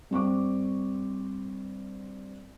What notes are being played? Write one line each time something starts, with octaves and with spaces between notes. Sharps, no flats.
G2 C4 C#6 D6